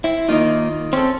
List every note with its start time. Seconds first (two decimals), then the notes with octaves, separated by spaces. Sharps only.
0.04 C4 E4
0.29 D#3 A#3 D#4 F4
0.93 C4 C#4 A4 C5